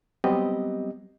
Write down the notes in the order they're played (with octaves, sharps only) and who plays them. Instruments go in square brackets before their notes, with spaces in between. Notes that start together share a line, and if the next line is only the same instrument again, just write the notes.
[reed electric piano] F#3 G3 B3 C4 G4 D#5